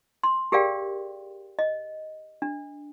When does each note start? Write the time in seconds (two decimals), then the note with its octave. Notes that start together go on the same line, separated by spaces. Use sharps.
0.24 C6
0.52 G4 G#4 A#4 D5 F5 G5
1.59 D#5
2.42 D4